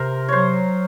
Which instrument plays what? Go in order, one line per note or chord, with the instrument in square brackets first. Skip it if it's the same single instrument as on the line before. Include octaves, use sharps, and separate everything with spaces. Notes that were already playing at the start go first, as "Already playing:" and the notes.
Already playing: [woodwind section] C3 [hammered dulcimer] A#4 C5
[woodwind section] F#3 [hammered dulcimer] C5 C#5